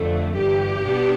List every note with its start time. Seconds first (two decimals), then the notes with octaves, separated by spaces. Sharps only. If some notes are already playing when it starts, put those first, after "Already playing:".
Already playing: F2 D3 A3
0.34 G1 G2 E3 G4
0.84 B2 B3 D4